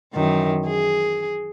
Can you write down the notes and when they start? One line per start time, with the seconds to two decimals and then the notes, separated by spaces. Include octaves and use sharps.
0.13 F#2 D#3 E3
0.67 G#4